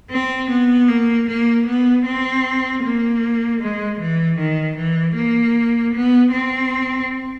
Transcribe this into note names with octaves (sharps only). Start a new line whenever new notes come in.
C4
B3
A#3
A#3
B3
C4
A#3
G#3
E3
D#3
E3
A#3
B3
C4